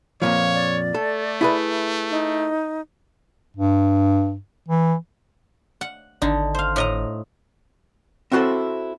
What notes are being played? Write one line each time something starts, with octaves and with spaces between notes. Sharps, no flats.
F2 A#2 F3 C#5
D5
A3 A4
E4 G#4 B4
D#4
G2
E3
F#5
G#1 D3 D#4
C5 F5
A2 D#5 A#5
C4 E4 F#4 G#4 A4 C5